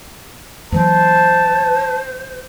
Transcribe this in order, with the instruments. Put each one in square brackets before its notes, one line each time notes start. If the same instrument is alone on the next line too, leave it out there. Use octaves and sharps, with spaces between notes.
[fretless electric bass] D#2 E3 F#3 [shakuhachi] C5 [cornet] A5